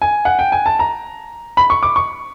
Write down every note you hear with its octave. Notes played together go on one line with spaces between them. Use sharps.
G#5
F#5
G5
G#5
A5
A#5
B5
C#6
D6
C#6